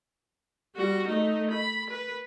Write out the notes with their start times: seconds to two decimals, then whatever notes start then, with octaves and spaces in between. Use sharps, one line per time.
0.76 G3 F#4
1.07 A3 D#4
1.51 B5
1.90 B4